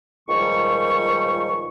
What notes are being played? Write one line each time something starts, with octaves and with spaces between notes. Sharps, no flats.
C#2 A#2 D#3 F3 G3 C#6